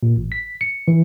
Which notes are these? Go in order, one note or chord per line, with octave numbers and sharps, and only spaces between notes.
A#2
A1
B6
C#7
E3